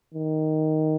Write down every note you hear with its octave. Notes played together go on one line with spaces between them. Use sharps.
D#3